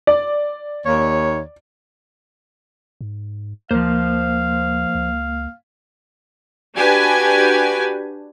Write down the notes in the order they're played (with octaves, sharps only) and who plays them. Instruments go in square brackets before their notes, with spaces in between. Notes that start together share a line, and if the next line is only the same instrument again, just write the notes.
[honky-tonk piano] D5
[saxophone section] D#2 C#5
[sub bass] G#2
[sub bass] D2 [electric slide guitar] F3 C5 [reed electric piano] A#3 [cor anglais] F5
[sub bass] C#2
[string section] D4 F#4 G4 B4 G#5